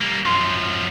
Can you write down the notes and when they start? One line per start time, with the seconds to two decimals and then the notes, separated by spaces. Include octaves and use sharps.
0.01 G3 A#3
0.25 F#2 F3 C6